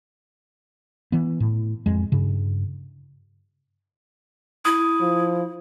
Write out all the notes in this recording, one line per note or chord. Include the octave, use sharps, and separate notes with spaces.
E3 B3
A2
F2 G#3
G2 C#3
E4 D#6
F3